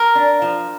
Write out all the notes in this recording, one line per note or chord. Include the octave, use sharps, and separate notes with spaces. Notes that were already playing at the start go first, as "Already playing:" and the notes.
Already playing: A#4
D4
F3